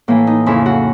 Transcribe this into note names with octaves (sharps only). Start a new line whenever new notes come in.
A2 E3 A#3
D#4
F2 C#3 F3 E4
F#4